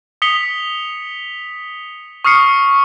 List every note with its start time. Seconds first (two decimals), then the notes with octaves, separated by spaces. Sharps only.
0.22 D#6 B6 C#7 F7 G7
2.25 C#6 D#6 F6 C7 C#7